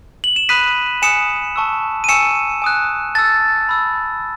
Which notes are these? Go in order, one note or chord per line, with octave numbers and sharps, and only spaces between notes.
F#7
E7
B5 D#6 F#6 B6 D#7
G#5 D#6 F#6 C#7 E7
A5 C#6 E6
D#7
G#5 C#6 E6 C#7 E7
G#5 D#6 F#6
A5 E6 A6
B5 E6